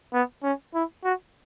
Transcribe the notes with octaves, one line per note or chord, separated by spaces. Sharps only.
B3
C#4
E4
F#4